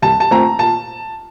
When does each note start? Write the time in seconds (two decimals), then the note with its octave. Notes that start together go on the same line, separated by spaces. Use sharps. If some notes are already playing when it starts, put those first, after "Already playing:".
0.02 C2 A5
0.20 A5
0.31 A#2 A3 C4 A#5
0.59 A#2 A5